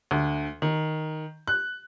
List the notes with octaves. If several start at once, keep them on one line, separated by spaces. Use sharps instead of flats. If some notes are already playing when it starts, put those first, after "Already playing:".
D2
D#3
F#6